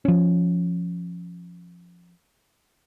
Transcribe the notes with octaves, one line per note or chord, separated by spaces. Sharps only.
F3 C#4